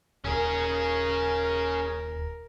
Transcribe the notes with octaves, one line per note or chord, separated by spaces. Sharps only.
D#1 C#4 G#4 A#4